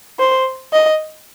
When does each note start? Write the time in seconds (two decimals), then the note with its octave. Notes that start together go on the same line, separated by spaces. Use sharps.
0.20 C5
0.73 D#5